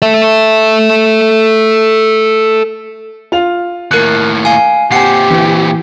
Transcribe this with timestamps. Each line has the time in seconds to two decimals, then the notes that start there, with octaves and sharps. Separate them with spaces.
0.02 A4 E5
3.32 F4 F7
3.91 D#2 A2 A#4 F#6
4.45 F5 G#5
4.92 A#2 C4 G4 F#5 G#5 C7
5.31 E3